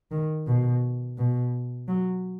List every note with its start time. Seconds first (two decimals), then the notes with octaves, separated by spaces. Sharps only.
0.11 D#3
0.47 B2
1.18 B2
1.88 F#3